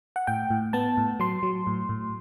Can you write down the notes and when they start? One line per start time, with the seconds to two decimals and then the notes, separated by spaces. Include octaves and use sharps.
0.16 F#5
0.27 A2 G5
0.50 A2
0.73 B3 A5
0.97 A2
1.20 F#3 C6
1.43 F#3
1.67 A2
1.89 A2